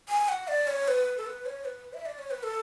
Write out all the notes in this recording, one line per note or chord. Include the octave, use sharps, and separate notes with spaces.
G#5
F#5
D5
C#5
B4
A4
B4
C#5
B4
E5
D5
C#5
B4
A4